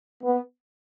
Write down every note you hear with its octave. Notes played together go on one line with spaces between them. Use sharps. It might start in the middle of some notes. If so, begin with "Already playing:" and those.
B3